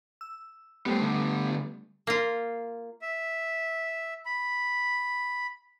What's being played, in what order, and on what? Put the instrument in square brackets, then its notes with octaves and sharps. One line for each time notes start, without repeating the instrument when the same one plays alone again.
[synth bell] E6
[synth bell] G3 A3 G4 [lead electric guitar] B3 C5
[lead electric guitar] D3 B3
[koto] A#3 F4
[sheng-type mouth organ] E5
B5